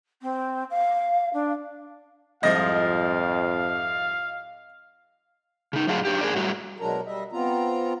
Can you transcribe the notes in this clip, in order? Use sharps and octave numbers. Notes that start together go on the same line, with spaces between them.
C4
F5
D4
C2 F2 G#2 F3 D#5 F5 A#6
C#3 D#4
A2 F#3 D4 F4 F#4 G#4
F#3 D4 G4
G#4 A#4 D5
A2 F#3 G3 A3 F#4
B2 F#3 G#3 D4 A#4 A#5
G3 D#5 E5
B3 C4 F4 A#5